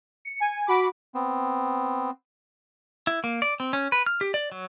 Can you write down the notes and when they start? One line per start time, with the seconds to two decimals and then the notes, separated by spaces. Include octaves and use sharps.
0.25 C#7
0.40 G#5
0.67 F#4 B5 D6
1.14 B3 C4
3.07 E4
3.24 A#3
3.42 D5
3.60 C4
3.73 C#4
3.92 B4
4.06 F6
4.21 G4
4.34 D5
4.52 F#3